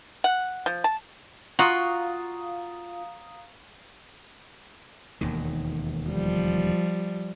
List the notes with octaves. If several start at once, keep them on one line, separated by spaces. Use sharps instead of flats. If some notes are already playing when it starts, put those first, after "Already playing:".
F#5
F3
A5
F4 F#4 F5 A#5 D#6
E1 D#2 D#3
F3 G3